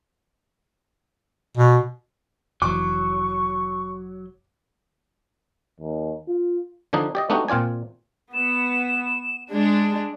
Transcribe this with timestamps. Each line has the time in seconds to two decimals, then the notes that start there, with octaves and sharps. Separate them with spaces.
1.57 B2
2.62 F1 E3 F#3 C#6 D6
5.80 D#2
6.28 F4
6.93 D3 F3 D4 D#4
7.15 G4 D5 D#5
7.30 A3 B3 D4 D#4 F#4 G4
7.48 A#2 C4 F4 D5 G#5
8.34 B3 E7
9.51 G#3 D4